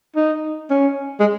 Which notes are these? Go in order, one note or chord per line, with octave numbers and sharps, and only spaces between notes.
D#4
C#4
G#3